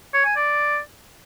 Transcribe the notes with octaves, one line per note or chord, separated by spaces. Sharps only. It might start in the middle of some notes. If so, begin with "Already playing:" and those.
C#5
G#5
D5